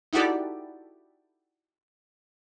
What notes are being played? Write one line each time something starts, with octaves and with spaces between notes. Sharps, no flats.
D#4 E4 F#4 G4 A4 D5